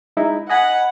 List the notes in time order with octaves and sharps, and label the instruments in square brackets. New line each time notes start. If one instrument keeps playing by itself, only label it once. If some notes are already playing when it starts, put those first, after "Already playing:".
[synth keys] G#3 D#4 E4
[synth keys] D#5 G#5 B5 [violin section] F#5